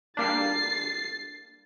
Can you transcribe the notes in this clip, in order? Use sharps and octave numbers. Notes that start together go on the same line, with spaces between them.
G3 A#3 D4 A6 C7